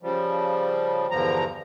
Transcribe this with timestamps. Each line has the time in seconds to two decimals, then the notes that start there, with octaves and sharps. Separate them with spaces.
0.02 C#3 F3 G3
1.11 E2 G2 D3 F3 A#5